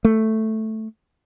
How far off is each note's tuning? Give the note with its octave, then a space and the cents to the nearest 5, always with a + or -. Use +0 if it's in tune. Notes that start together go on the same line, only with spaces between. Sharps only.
A3 +0